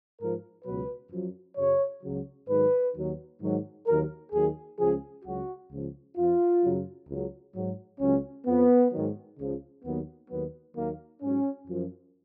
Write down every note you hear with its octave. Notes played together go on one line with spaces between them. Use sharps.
G#2 F3 A#4
C#2 B2 F#3 B4
F#2 F3
F#2 C#3 F#3 C#5
C#2 C#3 F#3
G#2 D#3 F#3 B4
D#2 D#3 F#3
G#2 D#3 F#3
D#2 D#3 F#3 A#4
D#2 D#3 F#3 G#4
C#2 C#3 F3 G#4
C#2 C#3 F#3 F#4
C#2 C#3 F3
F2 F3 F4
F#2 C#3 F#3
C#2 C#3 F#3
G#2 F#3
C#2 C#3 F#3 C#4
F2 F3 B3
G#2 D#3 F#3
C#2 C#3 F3
D#2 D#3 F#3 B3
D#2 D#3 F#3 B3
D#2 D#3 F#3 A#3
G#2 F#3 C#4
F#2 F3